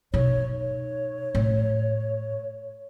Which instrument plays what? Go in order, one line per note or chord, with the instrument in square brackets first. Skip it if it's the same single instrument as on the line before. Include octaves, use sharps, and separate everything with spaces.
[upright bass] B2 D#4 [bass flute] C#5
[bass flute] C#5
[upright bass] A2